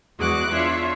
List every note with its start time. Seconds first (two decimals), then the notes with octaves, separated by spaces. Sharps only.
0.18 E2 G#3 F#4 G#4 D6 F#6
0.53 D4 F4 C#5 E5